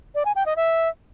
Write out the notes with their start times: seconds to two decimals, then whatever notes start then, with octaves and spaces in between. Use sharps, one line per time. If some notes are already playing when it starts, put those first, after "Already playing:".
0.15 D5
0.25 G#5
0.36 G5
0.46 D#5
0.56 E5